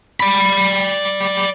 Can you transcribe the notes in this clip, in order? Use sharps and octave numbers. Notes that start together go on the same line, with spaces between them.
D5 B5